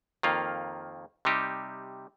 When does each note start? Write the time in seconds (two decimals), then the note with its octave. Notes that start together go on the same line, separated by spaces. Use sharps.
0.23 F2 D#3 A#3 F4
1.25 C3 G3 D#4 G4